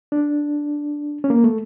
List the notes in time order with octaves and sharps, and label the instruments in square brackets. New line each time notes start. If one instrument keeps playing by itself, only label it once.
[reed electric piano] D4
C#4
A#3
A3